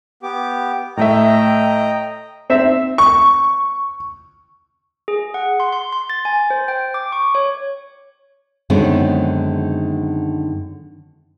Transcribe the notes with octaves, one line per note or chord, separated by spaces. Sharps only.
B3 G4 D6
A2 A3 D#5 E5 G5 A#5
C4 E5
C#6
G#4
F#5
C6
C6
C6
A6
G#5
C5
G5
D6
C#6
C#5
F#2 D3 D#3 G#3 B3 C4